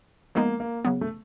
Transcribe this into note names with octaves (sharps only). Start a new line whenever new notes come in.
F3 G#3 A#3 B3 D#4
A#3
C#3 F#3 B3
A3